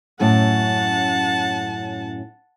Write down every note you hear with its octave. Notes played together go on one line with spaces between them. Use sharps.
F#2 A2 C#4 F#5 A5